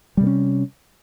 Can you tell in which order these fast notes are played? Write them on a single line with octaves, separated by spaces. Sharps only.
G3 C3 A#3 C#4